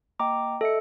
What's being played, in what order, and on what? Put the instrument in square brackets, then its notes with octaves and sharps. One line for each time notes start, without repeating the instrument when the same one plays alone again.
[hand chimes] A#3 D#5 G5 [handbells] A#5 D6
[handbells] A4 C#7 [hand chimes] D#5 E5